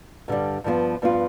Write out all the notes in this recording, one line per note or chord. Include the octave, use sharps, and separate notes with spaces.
G2 D3 G3
G2 F3 B3 F4
G2 F3 B3 F4